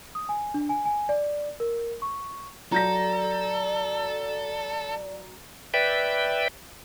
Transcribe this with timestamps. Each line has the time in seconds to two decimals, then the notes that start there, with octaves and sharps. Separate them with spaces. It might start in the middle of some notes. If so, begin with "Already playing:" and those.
0.15 D#6
0.29 G#5
0.54 D4
0.69 G#5
0.85 G#5
1.09 D5
1.60 A#4
2.02 C#6
2.72 F#3 A4 D5 A#5 G6 A#6
5.74 B4 D5 E5 G5